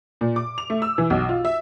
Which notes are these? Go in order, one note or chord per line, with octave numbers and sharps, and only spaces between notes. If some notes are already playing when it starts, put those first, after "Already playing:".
A#2
D6
F7
A3
E6
E3
B1
F4
E5